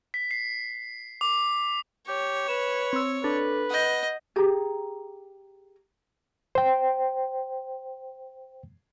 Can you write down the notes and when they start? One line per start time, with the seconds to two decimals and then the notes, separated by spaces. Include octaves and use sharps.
0.14 B6
0.31 C7
1.21 D6
2.08 G4 C#5
2.48 B4 E7
2.93 C4 E6
3.24 D4 A4 B4
3.71 D#5 F#5 G6
4.36 G4 G#4 A#5
6.55 C5 G5